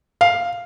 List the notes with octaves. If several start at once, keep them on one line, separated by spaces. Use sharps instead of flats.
F5